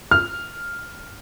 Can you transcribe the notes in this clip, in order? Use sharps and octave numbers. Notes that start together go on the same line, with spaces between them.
F6